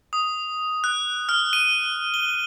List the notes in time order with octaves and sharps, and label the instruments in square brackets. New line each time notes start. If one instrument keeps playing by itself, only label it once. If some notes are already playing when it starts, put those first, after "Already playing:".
[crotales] D#6
F#6
F6
D#7
G7